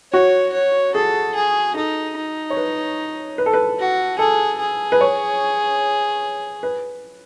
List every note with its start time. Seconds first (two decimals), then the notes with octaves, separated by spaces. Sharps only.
0.13 F#4 C#5
0.53 C#5
0.95 G#4 A4
1.35 G#4
1.76 D#4 A4
2.17 D#4
2.50 C#5
2.57 B4
3.38 B4
3.46 A4
3.53 B4
3.79 F#4
4.19 G#4 A4
4.59 G#4
4.92 B4
5.01 C#5
6.63 B4